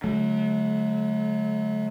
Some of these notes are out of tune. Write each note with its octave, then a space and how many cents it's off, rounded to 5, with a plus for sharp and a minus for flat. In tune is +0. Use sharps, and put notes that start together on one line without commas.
D3 -30 F#3 +0 A3 -45